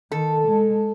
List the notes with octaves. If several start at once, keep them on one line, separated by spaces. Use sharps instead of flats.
D#3 A4
G#3